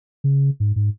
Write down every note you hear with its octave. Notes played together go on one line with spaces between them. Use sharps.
C#3
G#2
G#2